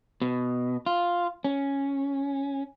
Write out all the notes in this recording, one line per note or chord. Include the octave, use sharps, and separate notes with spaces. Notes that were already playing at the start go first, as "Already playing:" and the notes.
B2
F4
C#4